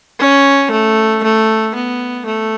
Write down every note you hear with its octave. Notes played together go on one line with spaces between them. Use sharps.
C#4
A3
A3
B3
A3